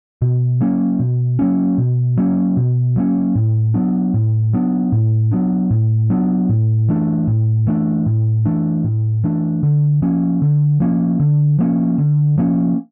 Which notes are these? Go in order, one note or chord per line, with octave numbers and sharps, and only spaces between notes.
B2
F#3 A#3 C#4
B2
F#3 A#3 C#4
B2
F#3 A#3 C#4
B2
F#3 A#3 C#4
A2
F#3 B3 D4
A2
F#3 B3 D4
A2
F#3 B3 D4
A2
F#3 B3 D4
A2
E3 A3 D4
A2
E3 A3 D4
A2
E3 A3 D4
A2
E3 A3 D4
D3
F3 A#3 C#4
D3
F3 A#3 C#4
D3
F3 A#3 C#4
D3
F3 A#3 C#4